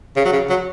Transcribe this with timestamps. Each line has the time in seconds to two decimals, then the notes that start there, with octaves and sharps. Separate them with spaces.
0.16 C#3
0.25 F#3
0.33 C#3
0.50 F#3